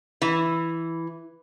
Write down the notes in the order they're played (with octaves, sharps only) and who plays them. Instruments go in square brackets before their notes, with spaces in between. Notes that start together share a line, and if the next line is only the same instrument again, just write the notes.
[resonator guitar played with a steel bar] E3